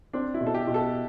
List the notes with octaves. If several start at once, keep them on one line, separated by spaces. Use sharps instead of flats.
C4 D4
E4
B2
A4
G4
B2
A4